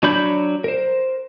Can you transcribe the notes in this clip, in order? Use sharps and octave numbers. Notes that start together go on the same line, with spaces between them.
F#3 D4 C#5 B5 G6
A#4 C5